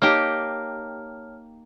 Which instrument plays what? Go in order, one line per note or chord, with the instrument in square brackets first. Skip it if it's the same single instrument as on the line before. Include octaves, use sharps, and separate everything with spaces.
[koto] A#3 D#4 G4 [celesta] C#5 A5 F6